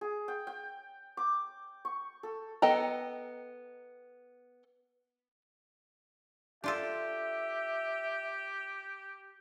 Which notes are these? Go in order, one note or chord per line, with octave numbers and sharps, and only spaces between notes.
G#4
G5
G5
D6
C#6
A4
B3 A4 D#5 G5 A#5
D4 F4 G4 A4 E5